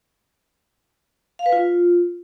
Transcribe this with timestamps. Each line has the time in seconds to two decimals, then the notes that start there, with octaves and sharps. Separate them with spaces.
1.39 F5
1.46 B4
1.52 F4